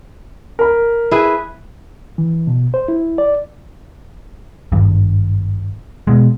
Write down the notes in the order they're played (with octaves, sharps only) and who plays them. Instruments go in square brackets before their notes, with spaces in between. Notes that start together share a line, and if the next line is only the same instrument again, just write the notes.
[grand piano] A#4 B5
[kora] E4 G#4 B4
[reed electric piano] E3
B2
C5
E4
D5
[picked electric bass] G#1 G2
B2 G#3